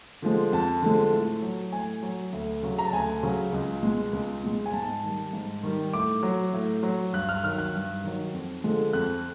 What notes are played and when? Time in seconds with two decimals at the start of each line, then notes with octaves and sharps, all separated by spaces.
0.22 D3 F3 G#3
0.52 F2 A5
0.82 D3 F3 G#3
1.13 A2
1.42 F#3
1.73 A2 G#5
2.03 F#3
2.32 D2
2.62 C#3 F#3
2.79 A#5
2.86 A5
2.93 D2 G#5
3.23 C#3 F#3
3.52 C#2
3.83 B2 G#3
4.13 C#2
4.43 B2 G#3
4.66 G#5
4.73 G#2 A5
5.03 D#3 G3
5.33 G#2
5.63 D#3 G3
5.93 A2 D6
6.23 F#3
6.53 A2
6.83 F#3
7.13 G2 F#6
7.29 F6
7.43 D#3 F#3 F6
7.58 F#6
7.74 G2
8.04 D#3 F#3
8.34 F2
8.64 D3 F3 G#3
8.93 F2 F#6